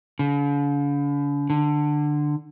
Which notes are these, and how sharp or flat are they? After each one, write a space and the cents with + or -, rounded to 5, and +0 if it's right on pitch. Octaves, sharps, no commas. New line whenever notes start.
D3 -45
D3 +15